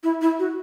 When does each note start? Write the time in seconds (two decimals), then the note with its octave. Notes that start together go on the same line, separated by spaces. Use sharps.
0.03 E4
0.21 E4
0.39 F#4